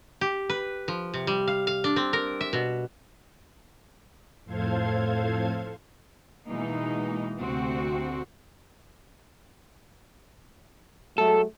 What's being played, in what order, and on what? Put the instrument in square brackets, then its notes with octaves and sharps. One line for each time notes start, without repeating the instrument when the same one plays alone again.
[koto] G4
B4
F3
C3
G3
F5
F5
D4
C4
A#4
E5
B2
[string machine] F2 A2 A4 C5 F5 G#6
[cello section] B2 E3 G#3 A#3 D#4
D2 C3 C4 F#4
[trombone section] F#3 G#3 A3 [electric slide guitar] A4